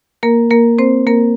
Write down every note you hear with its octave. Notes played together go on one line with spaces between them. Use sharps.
A#3 A#4
A#3 A#4
C4 C5
A#3 A#4